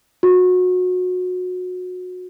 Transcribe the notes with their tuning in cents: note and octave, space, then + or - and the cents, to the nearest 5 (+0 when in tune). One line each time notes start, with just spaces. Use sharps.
F#4 -25